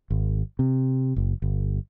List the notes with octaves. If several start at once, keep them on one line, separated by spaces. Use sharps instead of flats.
G#1
C3
F#1
G1